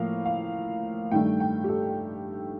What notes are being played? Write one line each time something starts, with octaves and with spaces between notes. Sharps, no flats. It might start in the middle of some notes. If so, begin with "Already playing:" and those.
Already playing: A2 F3 A#3 F5
F5
G2 D#3 A3 G5
G5
G4
A4